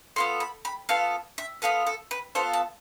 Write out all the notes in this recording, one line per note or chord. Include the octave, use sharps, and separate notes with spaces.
B3 F4 A4 C6
B5
B5
B3 F4 A4 F5
E5
B3 F4 A4 B4
A4
B4
B3 F4 A4 C5
A5